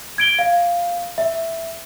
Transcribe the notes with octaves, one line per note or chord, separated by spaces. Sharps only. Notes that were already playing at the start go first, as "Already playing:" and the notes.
G#6 D7 G7
F5
E5